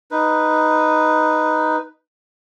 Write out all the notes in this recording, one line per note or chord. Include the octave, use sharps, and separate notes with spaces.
D#4 B4